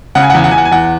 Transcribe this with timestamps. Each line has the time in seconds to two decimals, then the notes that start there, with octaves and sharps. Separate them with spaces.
0.15 C#3 F#5
0.23 G#5
0.30 F#5
0.34 E2 G#5
0.44 F#5
0.51 E2 G#5
0.58 F#5
0.65 G#5
0.72 E2 F#5